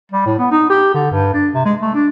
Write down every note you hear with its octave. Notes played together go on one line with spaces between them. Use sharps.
G3
A2
B3
D#4
G4
D3
G2
D4
C3
G#3
A3
D4